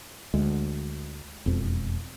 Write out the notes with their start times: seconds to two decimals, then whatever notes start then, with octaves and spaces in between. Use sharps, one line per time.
0.34 D2 G#3
1.46 E1 F2